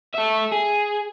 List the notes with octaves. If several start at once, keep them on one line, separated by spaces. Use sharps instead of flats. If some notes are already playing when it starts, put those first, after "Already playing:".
A4 E5
G#4